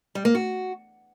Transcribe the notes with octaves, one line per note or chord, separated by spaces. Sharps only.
G3
A#3
F#4